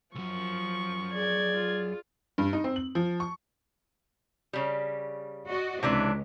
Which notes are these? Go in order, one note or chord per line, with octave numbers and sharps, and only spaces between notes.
C2 F#2 F3 C#6
G#4 D5 G#6
F4
G2
D#4
C4
F#7
F3
C#6
C#3 G3
F#4 D5 D#5
C#2 C3 E3 D4